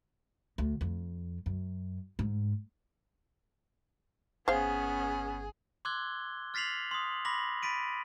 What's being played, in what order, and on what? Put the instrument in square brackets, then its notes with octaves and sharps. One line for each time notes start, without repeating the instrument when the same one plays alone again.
[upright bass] D2
F2
F#2
G#2
[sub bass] G1 [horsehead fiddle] B3 C#4 [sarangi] G#4 [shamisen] C5 F5
[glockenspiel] C6 D6 E6 F#6 G#6 G7
F6 A6 B6 C7 F7 F#7
C6 D#6
B5 C6 D6 A#6 B6 F#7
B5 A6 B6 D7 D#7